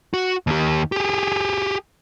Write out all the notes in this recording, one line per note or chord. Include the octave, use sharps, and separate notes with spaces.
F#4
D#2 G4
G4 G#4